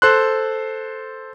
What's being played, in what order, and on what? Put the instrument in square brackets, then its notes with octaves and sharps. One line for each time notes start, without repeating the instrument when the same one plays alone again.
[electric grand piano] A4 C5 C6 F#6